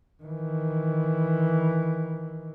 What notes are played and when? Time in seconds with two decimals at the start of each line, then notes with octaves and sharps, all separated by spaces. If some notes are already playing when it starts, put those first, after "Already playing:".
0.23 D#3 E3